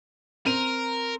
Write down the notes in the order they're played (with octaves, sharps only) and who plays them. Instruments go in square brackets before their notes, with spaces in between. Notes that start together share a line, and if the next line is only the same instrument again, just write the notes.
[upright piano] C4 D#7 F7 [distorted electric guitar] A#4